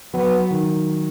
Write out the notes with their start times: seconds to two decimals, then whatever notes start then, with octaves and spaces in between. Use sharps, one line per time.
0.13 F#3 B3
0.50 D#3